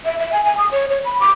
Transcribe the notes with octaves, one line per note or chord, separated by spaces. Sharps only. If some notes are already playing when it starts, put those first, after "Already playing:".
E5
E5
G#5
G#5
D#6
C#5
C#5
B5
D6